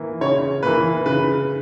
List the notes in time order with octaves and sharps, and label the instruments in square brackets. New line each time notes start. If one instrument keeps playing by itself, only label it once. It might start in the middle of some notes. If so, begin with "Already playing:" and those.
Already playing: [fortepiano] E3 A#3
[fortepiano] C#3 [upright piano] C#5
[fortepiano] E3 A#3 [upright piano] B4
[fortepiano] C#3 [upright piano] B4